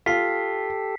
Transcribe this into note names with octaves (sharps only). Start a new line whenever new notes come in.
F4 G4 A4 B6 C7